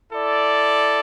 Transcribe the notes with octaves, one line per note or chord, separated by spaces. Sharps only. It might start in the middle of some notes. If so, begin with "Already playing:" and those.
E4 A4 D5